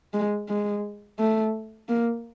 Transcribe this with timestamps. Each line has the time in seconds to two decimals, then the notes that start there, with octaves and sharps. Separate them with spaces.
0.13 G#3
0.49 G#3
1.19 A3
1.89 A#3